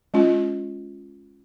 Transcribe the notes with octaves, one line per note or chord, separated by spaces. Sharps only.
G#3 C#4 F4